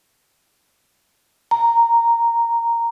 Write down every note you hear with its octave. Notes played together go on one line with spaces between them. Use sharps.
A#5